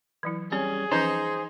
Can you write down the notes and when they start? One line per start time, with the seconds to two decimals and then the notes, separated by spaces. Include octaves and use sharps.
0.23 E3 F#3 E4
0.52 G3 C4 C#4 G#4 C#5
0.92 E3 F3 C#4 D#4 C5